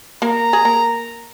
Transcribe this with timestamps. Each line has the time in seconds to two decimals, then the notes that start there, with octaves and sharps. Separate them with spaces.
0.22 A#3 A#4 A#5
0.53 G#4
0.65 A#3 A#4